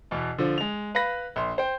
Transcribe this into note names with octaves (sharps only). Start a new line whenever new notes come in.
E2 B2
D3 F3
G#3 F7
B4 F5 B5 A#6
A#1 C6
C5 G5